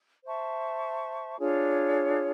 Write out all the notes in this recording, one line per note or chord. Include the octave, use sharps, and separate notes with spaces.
C5 E5 A5 C#6
D4 F4 G#4 C#5